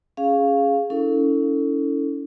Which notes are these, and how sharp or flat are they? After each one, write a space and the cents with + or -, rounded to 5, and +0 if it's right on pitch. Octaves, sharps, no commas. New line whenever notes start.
C#4 +0 G#4 +0 F5 +0
C#4 +25 E4 -25 A4 +20